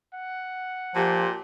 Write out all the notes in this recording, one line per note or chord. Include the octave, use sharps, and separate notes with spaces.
F#5
A#2 F3 G4